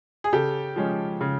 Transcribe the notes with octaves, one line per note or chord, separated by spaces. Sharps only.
G#4
C#3 G4 A4
F3 G#3 C#4
C#3